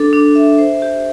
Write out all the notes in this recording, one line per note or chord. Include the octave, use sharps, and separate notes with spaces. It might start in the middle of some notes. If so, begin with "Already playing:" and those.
Already playing: D4 A4
D4
E5
C5
G4